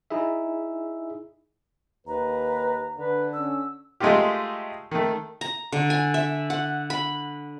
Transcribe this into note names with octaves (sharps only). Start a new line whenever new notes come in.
D#4 E4 G#4 E5
D#2 B4 A#5
D3 B4
C#4 E6
G#3 A3 D#4 F4 G4
D#3 A3
A#5
D3
G#5
E5
F#5
B5